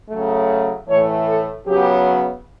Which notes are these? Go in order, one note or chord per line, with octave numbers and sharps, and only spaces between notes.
C#3 F#3 A3
A2 E3 A3 C#5
A4
C#3 F#3 B3 G4